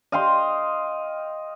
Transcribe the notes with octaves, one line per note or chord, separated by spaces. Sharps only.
D#5 F5 G5 C6